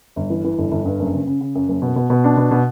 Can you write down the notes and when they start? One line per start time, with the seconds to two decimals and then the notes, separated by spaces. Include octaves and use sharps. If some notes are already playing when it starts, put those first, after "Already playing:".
0.16 G1
0.30 E3
0.44 E3
0.58 G1
0.71 G1
0.85 G2
0.99 F#1
1.14 C#3
1.27 C#3
1.41 C#3
1.55 F#2
1.68 F#1
1.82 B2
1.96 B2
2.10 B2
2.24 D4
2.37 B2
2.51 B2